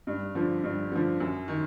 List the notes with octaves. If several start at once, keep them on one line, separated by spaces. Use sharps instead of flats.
G2
D3 F3
G2
D3 F3
F#2
D#3